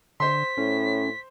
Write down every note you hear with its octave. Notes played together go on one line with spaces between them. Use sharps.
D3 C5 C6 B6
A2 C#4